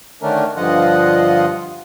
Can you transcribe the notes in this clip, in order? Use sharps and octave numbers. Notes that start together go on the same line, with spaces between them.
D3 D#3 A3 C#4 D4 A#4
G2 D3 F3 F4 D#5 F#5